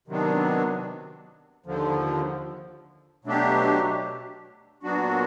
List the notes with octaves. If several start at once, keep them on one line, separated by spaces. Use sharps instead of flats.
C3 D#3 F#3 B3 D4
D#2 D3 F3
B2 F#3 A3 D4 G4
A#2 F#3 B3 D4 F#4